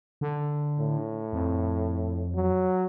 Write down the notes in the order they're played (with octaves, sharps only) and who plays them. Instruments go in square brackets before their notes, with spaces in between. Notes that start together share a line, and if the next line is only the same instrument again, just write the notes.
[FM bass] D3
[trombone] A2
[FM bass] F2
[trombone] F#3